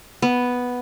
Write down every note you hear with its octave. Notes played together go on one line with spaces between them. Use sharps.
B3